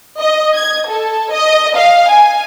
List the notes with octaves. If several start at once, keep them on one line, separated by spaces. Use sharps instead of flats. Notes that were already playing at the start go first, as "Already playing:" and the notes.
D#5
G#6
A4
D#5
F5
G#5